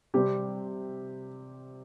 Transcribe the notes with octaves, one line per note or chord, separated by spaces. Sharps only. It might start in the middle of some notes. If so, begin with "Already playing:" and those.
C3 G3 C4 G4